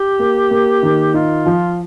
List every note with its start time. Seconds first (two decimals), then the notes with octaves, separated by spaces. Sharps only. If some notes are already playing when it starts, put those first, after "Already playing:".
Already playing: G4
0.19 A#3
0.51 A#3
0.83 D#3
1.14 D#4 F4
1.46 F3